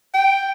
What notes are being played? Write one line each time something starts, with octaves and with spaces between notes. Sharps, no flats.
G5